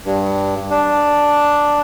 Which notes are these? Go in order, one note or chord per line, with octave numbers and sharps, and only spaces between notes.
G2
D4